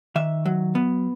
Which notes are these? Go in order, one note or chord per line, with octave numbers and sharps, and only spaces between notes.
D#3 E5
F#3
B3